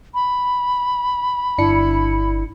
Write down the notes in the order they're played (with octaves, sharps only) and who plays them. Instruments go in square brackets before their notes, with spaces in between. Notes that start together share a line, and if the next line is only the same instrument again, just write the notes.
[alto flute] B5
[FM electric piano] G1 D4 C#7 [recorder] E4